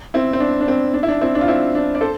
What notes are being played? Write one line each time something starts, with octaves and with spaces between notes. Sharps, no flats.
C4 E4
C4
D4
D4
C4
D4
E4
D4
C4 E4
D4
F4
C4 E4
D4
D5
A4 C5